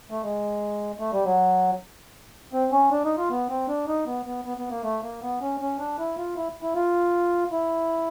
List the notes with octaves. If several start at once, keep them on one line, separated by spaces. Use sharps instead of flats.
A3
G#3
A3
G3
F#3
C4
C#4
D4
D#4
F4
B3
C4
D4
D#4
B3
B3
B3
B3
A#3
A3
A#3
B3
C#4
C#4
D4
E4
F4
E4
E4
F4
E4